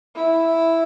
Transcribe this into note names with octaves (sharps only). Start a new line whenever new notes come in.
E4